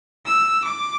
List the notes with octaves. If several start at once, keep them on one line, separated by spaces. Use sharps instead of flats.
E6
D6